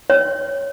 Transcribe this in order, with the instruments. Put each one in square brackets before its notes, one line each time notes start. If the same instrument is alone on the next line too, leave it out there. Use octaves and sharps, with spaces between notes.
[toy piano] C#5